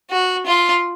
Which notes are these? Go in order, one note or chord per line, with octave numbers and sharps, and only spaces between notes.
F#4
F4